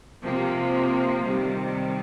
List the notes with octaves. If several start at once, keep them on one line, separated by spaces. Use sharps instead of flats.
C3 F3 A#3
C3 D#3 G3